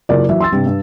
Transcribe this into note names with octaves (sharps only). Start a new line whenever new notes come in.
F#1 F#3 F4 A#4 D5
E3 F#3 E5
C6 E6 A6
G2 C3 G3
G2